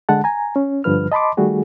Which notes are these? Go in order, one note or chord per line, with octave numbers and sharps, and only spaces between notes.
D3 G#3 F#5 A5
G#5 A#5
C#4
G2 D3 F3 B4 F6
D#5 A5 B5 C6 D6
D#3 G3 A3 F#4 G#4